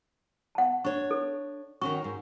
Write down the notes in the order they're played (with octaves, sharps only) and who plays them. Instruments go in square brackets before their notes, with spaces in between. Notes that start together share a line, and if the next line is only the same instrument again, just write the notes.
[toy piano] F#5 A5
[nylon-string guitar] D4 C#5 [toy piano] C#6
[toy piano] A4
[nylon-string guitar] D#3 C#4 F#4 [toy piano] C#6
[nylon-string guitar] G#2